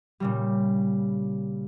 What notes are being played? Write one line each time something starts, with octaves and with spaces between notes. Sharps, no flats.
A#2 C#3 G3